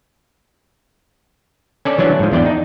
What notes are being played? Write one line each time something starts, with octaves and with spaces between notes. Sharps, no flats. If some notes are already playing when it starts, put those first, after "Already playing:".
C#4 A4 D5
E3 F#3 C#4 D4
G#2 F3
E2 D4 D5 G5
D#4